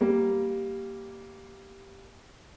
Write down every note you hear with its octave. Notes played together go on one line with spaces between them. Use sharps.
G3 A#3